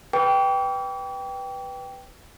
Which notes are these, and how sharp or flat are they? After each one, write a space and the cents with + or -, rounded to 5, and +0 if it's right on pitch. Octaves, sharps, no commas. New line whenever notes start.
B4 +0 G5 +0 D6 -45